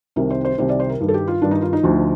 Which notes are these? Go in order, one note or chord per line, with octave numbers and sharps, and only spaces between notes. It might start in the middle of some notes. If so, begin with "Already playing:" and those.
C2 C3 D#3 A#4
C5
C5
C2 C3 D#3 C5
D5
C5
A#4
G2 D#3
A4
G4
F4
G2 D#3 D4
D#4
F4
D#4
D2 D3 F3